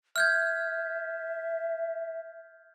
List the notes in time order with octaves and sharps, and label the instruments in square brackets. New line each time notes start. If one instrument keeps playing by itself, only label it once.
[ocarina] E5 [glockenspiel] F6 G6 G#6